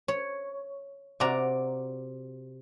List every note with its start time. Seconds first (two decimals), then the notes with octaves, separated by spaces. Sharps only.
0.08 C#5
1.20 C3 F#4 D5 A#5